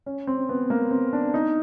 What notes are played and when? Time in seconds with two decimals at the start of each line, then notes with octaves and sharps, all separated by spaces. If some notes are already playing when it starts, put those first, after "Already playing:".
0.06 C#4
0.27 C4
0.49 B3
0.70 A#3
0.91 C4
1.13 D4
1.34 D#4